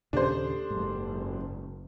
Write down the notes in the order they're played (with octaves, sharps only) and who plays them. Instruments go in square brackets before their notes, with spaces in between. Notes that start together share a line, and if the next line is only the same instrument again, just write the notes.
[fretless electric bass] D#2 A#2 C#3 [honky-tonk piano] D4 C5 [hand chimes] G4 A4
[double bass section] F#1 [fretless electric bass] G#2